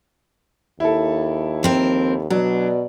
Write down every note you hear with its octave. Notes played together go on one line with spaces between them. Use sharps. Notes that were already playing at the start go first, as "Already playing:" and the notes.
D#2 E4 A4
F3 C4 A#4
B2 F#3 D4